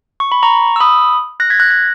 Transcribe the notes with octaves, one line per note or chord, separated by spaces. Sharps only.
C#6
B5
A#5 C#6
E6
B5 D#6
F#6 A#6
G#6 B6
F#6 A#6
F#6 A#6